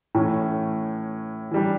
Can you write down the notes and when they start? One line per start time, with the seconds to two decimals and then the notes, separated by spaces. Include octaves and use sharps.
0.15 A2 E3 A3 C#4
1.51 E3 G3 D4